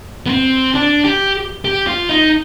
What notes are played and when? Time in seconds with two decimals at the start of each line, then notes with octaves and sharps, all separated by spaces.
0.26 B3
0.29 C4
0.75 D4
1.04 G4
1.65 G4
1.87 F4
2.09 D#4